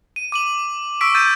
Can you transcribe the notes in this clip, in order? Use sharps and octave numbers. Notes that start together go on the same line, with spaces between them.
D#7
D6 D#7 F#7
C#6 E6 B6 D7
E6 G6 A6 D#7